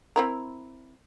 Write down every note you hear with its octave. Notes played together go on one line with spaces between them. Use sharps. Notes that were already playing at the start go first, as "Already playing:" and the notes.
C4 E4 A#4